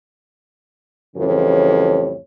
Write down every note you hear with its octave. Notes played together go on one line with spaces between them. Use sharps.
F2 A2 C#3 E3 G3 C#5